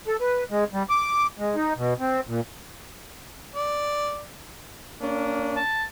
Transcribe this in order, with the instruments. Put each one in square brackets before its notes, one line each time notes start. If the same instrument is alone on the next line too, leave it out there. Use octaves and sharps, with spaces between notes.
[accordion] A4
B4
G#3
G3
D6
G#3
D#4
B2
C4
A#2
[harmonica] D5
[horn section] A#3 C#4 D4
[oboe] A5